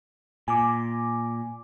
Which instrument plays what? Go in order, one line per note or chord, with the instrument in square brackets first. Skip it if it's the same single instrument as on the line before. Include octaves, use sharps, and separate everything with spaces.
[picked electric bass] A#2 [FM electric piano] G#5 D6